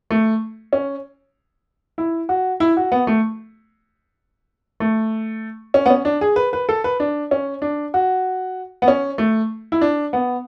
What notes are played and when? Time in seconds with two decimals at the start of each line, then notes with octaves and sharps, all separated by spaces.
0.10 A3
0.73 C#4
1.98 E4
2.29 F#4
2.60 E4
2.77 F#4
2.92 B3
3.07 A3
4.80 A3
5.74 C#4
5.86 B3
5.90 C#4
6.05 D4
6.21 G#4
6.36 B4
6.53 B4
6.69 A4
6.84 B4
7.00 D4
7.31 C#4
7.62 D4
7.94 F#4
8.82 B3
8.88 C#4
9.18 A3
9.72 E4
9.81 D4
10.13 B3